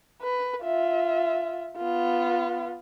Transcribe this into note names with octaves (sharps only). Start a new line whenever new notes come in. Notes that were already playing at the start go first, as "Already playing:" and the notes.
B4
F4 E5
B3 F4